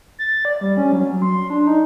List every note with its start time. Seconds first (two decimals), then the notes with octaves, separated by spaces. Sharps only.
0.19 A6
0.45 D5
0.61 G3
0.77 C#4
0.92 F#3
1.22 C6
1.50 D4
1.67 D#4